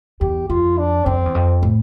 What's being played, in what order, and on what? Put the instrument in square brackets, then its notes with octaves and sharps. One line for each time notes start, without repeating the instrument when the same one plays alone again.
[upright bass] E2 [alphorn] G4
[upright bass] F2 [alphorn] F4
[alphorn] D4
[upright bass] F2 [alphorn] C4
[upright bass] E2
F2
A2